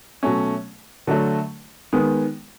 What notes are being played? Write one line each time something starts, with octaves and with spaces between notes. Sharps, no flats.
B2 F#3 A3 C#4
D3 F#3 A3
D#3 G#3 B3